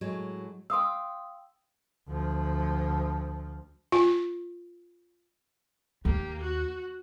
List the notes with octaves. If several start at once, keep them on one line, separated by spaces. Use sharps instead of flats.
A2 F#3 G#3
F5 G5 C6 D#6 E6
D2 F3
F4
D#2 A#3 G4
F#4